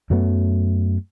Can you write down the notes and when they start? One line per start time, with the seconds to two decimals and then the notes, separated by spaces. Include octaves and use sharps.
0.10 F#2 F#3 A3 B3